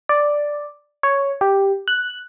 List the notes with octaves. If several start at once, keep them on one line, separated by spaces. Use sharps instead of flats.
D5
C#5
G4
F#6